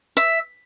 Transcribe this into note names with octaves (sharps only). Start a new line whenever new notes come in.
E5